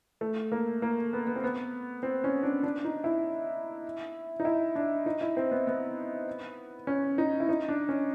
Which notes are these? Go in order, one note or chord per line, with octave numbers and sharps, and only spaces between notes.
A3
A#3
A#3
B3
B3
C4
B3
C4
C#4
D4
D4
D#4
E4
D#4
E4
D4
D#4
E4
C4
B3
B3
C#4
D#4
E4
D#4
D4
C#4